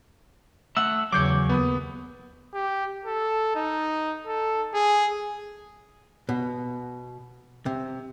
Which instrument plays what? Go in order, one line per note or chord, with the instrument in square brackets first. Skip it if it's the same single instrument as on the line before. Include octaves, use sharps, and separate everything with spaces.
[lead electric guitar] A3 F#5 [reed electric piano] E6
[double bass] E2 C#3 [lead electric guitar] F#3 C#5 [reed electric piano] D6 G6
[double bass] D#2 [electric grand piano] B3 B5 D#6
[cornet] G4
A4
D#4
A4
G#4
[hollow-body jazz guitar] B2
C3